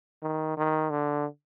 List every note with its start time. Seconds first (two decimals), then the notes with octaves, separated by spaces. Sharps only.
0.22 D#3
0.57 D#3
0.90 D3